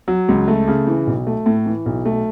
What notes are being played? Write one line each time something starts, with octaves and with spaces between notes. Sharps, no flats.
F#3
C#2
A3
C#3
E3
B1
A3
A2
E3
B1
A3